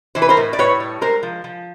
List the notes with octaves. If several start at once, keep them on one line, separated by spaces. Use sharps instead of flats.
E3 C5
B4
A#4 C5
A2
D5
A2 B4 C#5
G3
G#3 A#4 C5
F3
F3